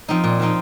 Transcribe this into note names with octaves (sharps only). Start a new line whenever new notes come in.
F3 C4 D#4
A#2
F3 C4 D#4